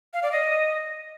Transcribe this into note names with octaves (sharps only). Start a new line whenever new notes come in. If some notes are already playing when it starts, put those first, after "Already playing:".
F5
D5
D#5